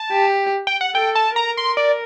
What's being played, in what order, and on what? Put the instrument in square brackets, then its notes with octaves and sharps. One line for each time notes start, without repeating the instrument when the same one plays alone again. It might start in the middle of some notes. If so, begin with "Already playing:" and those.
Already playing: [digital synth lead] A5
[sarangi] G4
[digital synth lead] G5
F#5
[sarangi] A4 [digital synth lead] G5
[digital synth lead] A5
[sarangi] A#4 [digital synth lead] A#5
[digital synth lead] C6
D5